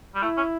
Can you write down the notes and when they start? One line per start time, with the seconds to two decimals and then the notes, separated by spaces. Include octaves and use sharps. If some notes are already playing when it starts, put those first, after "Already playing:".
0.15 G3
0.23 A3 E4
0.37 C#4